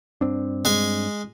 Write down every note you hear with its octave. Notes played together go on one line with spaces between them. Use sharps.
G2 C4 D4
G#3 G#5